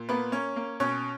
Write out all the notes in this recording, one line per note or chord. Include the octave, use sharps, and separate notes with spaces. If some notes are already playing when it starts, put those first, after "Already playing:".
Already playing: A#2
A#3 B3 B4
A#3 C#4 C#5
A#3
B2 C#4 C#5